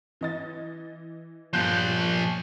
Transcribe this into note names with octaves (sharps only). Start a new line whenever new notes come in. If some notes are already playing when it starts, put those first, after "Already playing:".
E3 D#5 A6
G1 A#2 F3 F#6 G6